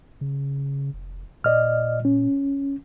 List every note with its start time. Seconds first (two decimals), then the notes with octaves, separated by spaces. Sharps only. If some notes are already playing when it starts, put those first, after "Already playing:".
0.21 C#3
0.93 F1
1.44 A#2 D5 D#5 F6
2.05 C#4